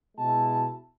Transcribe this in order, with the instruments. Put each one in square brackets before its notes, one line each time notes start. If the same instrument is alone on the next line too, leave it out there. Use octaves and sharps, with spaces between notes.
[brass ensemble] B2 G#3 E4 F#4 A5